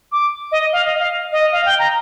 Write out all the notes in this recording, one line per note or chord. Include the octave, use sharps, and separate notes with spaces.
D6
D#5
F5
D#5
F5
D#5
F5
G5
A#5